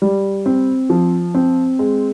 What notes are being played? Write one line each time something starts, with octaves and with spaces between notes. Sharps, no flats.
G3
C4
F3
C4
G#3